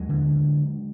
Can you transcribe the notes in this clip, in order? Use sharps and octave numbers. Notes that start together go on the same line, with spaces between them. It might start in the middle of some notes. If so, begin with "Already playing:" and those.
Already playing: D#2 F#3 G#3
D3